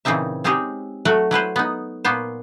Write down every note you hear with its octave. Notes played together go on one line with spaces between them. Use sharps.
A#2 C#3 E3 C4 D#4 E5
G#3 C4 C#4 D#4 G4 G#4
F#3 A3 F#4
F#3 E4 B4 C5
B3 D#4
A#2 A#3 B3 C5